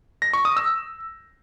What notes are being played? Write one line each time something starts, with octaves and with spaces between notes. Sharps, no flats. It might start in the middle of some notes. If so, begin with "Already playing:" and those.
A#6
C#6
D#6
E6